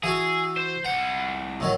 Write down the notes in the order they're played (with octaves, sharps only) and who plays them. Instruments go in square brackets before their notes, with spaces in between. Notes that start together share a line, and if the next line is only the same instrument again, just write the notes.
[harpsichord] E3 F#4 A4 [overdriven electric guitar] G#4
[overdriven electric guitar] C5
[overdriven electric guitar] C2 F#5 [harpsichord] G5
[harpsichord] A2 D#3 F#3